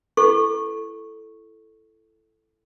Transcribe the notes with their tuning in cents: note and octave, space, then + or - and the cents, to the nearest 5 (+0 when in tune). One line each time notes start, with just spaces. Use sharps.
E4 +20 A4 +0 C#6 -10